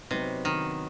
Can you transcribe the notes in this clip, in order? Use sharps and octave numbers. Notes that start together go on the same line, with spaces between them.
C3 F#3 B3 D#4
D#3